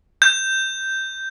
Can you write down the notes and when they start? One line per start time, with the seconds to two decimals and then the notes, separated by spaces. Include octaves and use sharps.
0.22 G6